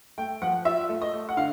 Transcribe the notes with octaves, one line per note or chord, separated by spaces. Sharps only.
A3 G5
F3 F#5
F4 E5
A3
D#5
A3
F#5
D3 F5